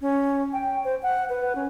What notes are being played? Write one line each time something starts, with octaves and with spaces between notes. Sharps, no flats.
C#4
G5
C5
F#5
B4
C#4